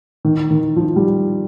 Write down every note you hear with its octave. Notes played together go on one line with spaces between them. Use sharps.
D#3
D#3
F3
G3